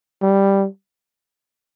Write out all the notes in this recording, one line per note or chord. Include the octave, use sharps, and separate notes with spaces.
G3